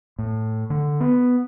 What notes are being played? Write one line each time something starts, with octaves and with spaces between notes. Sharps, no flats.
A2
D3
B3